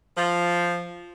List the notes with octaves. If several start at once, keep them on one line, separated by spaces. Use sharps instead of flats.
F3